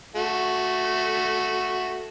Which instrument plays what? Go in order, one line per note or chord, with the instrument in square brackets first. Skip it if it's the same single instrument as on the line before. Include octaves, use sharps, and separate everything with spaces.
[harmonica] A3 F#4